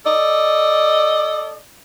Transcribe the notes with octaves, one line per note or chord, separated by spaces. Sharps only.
A4 D5 D#5